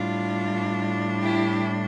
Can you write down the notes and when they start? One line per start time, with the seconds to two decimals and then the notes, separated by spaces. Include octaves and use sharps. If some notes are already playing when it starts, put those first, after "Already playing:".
Already playing: A2 G3 D4 F4
1.22 E4 G4